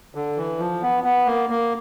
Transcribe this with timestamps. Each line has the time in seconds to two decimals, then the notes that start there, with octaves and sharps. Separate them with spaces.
0.15 D3
0.37 E3
0.59 F3
0.82 B3
1.04 B3
1.26 A#3
1.50 A#3